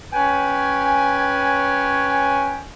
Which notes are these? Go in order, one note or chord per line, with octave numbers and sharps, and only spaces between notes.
C#4 B4 C#5 G5 G#5